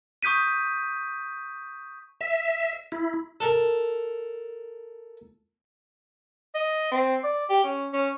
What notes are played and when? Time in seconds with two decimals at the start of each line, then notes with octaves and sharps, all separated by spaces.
0.23 C#6 D#6 G6 B6 D#7
2.21 E5
2.92 E4
3.40 A4 A#4
6.55 D#5
6.92 C4
7.24 D5
7.50 G4
7.64 C#4
7.93 C#4